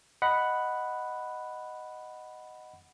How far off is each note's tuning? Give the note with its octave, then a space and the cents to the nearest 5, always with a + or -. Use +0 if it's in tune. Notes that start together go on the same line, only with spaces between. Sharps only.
D#5 +0 F#5 +0 B5 +0